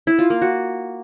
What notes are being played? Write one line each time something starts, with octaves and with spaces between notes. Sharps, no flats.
E4
F4
A#3
F#4